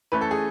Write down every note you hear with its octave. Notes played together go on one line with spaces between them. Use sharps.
E3 A3 C#4 B4
A4
G#4